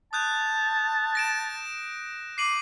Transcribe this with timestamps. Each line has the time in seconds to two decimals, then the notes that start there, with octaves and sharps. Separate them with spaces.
0.13 A5 D#6 F#6 G6
1.15 A#6 D7 E7
2.38 D6 C7 D#7 F#7